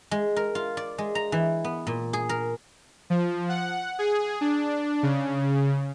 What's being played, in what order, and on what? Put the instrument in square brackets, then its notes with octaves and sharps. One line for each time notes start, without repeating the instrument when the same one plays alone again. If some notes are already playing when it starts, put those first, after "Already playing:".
[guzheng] G#3
A#4
F4
D5
G#3
A#5
E3
B3
A#2
G#4
A#4
[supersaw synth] F3
F#5
G#4
D4
C#3